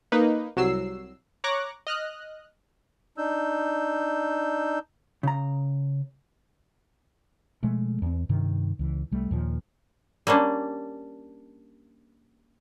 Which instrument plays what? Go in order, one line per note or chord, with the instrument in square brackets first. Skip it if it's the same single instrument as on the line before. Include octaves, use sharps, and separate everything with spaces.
[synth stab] A#3 D#4 B4
C2 F#3 E6 C7
C#5 A#5 C#6 D6 F#6 A#6
D#5 F6 F#6
[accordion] D4 D#4 E6 G6
[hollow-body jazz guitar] C#3 A#5
[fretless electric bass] B2 F3 G#3 A3
E2 C4
G2 C3 D#3
C#2 E3
C2 G3 A3
D#2 A#2 F3
[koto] G3 A#3 C#4 D4